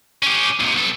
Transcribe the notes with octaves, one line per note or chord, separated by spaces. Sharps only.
C#4 G4
D#2 C3
B1 A4